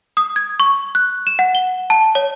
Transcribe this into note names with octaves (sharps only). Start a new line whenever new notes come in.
D#6
G#6
C#6
F#6
E7
F#5
G7
A5
C#5